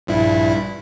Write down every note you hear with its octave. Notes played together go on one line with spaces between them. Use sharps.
A#1 G2 E4